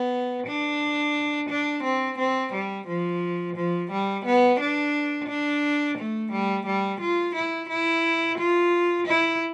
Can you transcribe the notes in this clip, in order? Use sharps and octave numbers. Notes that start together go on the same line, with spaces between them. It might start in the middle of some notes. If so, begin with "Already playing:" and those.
Already playing: B3
D4
D4
C4
C4
G3
F3
F3
G3
B3
D4
D4
A3
G3
G3
F4
E4
E4
F4
E4